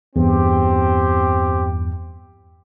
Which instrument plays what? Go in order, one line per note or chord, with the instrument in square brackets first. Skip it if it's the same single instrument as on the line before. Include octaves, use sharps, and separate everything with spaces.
[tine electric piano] E2 G2 [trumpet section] C4 G4